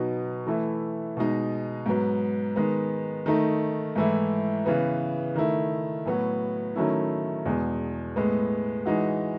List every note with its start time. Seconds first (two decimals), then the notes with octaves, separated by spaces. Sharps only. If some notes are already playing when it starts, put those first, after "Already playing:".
Already playing: B2 F#3 B3 D#4 F#4
0.47 E3 A3 E4
1.17 B2 G#3 D#4
1.86 G#2 F#3 B3
2.56 D#3 G#3 B3
3.26 D#3 A3 D#4
3.96 G#2 E3 A3 E4
4.66 C#3 E3 B3
5.36 D#3 A3 E4
6.06 A2 F#3 B3 F#4
6.76 D#3 F#3 A3 C#4 E4
7.45 E2 B2 G#3
8.16 A2 G#3 B3
8.85 E3 G#3 D#4 F#4